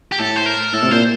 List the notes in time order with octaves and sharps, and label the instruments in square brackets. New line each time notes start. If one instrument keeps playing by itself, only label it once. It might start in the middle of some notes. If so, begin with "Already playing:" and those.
[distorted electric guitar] G4
[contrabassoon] A2 [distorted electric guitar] A4
[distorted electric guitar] C5
A#4
[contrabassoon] A2 [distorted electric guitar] A4
[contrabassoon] C3
[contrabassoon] A#2 [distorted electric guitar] C5